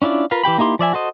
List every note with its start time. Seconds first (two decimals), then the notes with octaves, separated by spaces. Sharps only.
0.02 C#4 D4 E4 F4 D5
0.31 F4 A#4 B4 F5
0.43 E3 G4 G5 B5
0.58 A#3 D#4 E4 G4 C6
0.79 F3 D5 E5 G#5
0.93 F#4 A4 C5 D#5